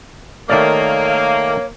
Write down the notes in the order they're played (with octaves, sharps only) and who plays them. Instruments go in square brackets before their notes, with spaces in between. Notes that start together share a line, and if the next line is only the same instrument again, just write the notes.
[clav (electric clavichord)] D#3 A3 D5 [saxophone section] A#3 [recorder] C#5